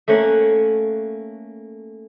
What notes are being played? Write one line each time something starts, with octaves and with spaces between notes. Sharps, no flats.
A3 A#3 C#4 F#5